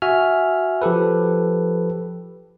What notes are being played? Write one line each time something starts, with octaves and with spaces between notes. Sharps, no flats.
F#4 E5 G#5 F6
F3 G4 A4 B4